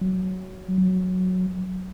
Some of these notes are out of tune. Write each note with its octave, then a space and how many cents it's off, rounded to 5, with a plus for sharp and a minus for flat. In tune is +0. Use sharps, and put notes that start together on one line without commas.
F#3 +10
F#3 -5